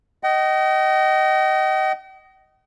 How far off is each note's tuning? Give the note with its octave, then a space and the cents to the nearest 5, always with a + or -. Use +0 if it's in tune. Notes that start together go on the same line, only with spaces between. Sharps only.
D#5 +0 G5 -45